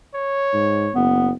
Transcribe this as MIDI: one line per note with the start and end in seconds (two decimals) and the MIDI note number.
0.15 0.96 73
0.53 0.88 44
0.95 1.31 30
0.95 1.32 59